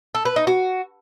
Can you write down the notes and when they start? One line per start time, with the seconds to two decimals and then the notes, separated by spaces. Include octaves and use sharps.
0.15 A4
0.25 B4
0.36 D#4
0.47 F#4